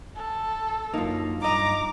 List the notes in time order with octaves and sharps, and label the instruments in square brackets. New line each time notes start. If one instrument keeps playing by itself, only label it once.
[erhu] A4
[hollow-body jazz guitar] F#2 A#3 [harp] D#4 F4
[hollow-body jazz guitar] G2 D#5 [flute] A#5 [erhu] D6